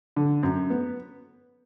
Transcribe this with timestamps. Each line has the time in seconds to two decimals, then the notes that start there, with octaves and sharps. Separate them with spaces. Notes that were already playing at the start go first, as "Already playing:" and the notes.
0.16 D3
0.43 F#2
0.70 B3